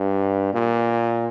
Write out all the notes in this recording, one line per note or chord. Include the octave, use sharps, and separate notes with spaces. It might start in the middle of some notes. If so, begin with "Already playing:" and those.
Already playing: G2
A#2